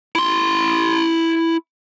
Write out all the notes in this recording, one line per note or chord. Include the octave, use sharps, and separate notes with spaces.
E4 C6